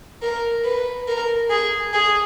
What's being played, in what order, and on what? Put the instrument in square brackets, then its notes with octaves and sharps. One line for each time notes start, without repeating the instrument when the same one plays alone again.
[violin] A#4
B4
A#4
G#4
G#4